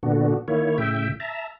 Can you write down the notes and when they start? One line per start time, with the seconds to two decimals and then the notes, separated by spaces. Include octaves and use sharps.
0.03 A#2 D3 B3 D4 F#4
0.48 D#3 A#3 E4 C#5
0.78 A2 C#3 E5 G5
1.20 E5 A5 A#5